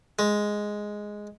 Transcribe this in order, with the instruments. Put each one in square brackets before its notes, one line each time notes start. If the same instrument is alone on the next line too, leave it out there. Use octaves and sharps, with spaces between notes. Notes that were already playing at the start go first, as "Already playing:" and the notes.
[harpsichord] G#3